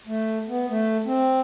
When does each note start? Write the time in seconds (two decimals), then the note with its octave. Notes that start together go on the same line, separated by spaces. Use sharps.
0.07 A3
0.48 B3
0.70 A3
1.06 C4